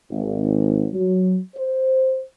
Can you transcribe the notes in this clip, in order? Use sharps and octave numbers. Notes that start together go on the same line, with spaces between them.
G#1
F#3
C5